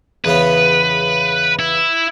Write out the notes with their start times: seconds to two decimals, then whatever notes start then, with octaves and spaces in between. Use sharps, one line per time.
0.25 E2 C#3 B3 B4
1.59 E4